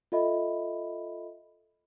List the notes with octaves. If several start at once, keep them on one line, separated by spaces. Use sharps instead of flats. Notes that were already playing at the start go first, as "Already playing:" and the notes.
F4 A4 D#5 E5 B5